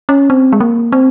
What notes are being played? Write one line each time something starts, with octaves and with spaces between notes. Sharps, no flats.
C#4
C4
G#3
A#3
C4